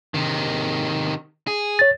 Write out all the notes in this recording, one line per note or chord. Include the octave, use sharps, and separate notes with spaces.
C3 D#3
G#4
C#5 A6